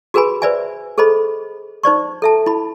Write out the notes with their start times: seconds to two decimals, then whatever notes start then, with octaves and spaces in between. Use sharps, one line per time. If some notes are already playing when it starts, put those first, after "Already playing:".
0.14 F#4 G#4 A#4 B4 G#5 B5
0.42 B4 C5 D5 E5 G#5
0.98 G#4 A4 C5 D#5 B5
1.83 D#4 C5 D5 C#6
2.22 A4 E5 A5
2.46 E4 B5